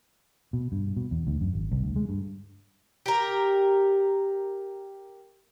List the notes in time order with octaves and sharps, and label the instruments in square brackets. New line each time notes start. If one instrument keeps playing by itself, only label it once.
[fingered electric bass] B2
G2
B2
E2
D2
F#2
G#1
C2
D2
G#3
G2
[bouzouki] G4 A#4